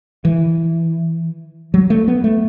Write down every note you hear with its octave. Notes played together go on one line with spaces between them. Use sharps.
E3
F#3
A3
B3
A3